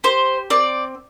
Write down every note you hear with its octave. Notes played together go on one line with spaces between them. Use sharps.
G4 C5
C4 D5